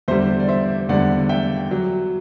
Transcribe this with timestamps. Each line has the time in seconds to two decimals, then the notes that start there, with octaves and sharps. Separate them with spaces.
0.08 E2 D3 G3 C5 E5
0.40 D5
0.48 C5 E5
0.89 E2 D3 G3 D5 F#5
1.29 E5 G5
1.71 F#3